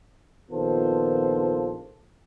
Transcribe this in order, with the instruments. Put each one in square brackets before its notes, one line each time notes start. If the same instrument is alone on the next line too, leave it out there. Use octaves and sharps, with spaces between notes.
[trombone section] A#1 D#3 B3 F4 A4 C5